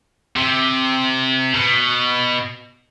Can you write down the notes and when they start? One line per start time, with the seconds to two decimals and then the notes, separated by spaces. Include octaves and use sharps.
0.36 C3
1.54 B2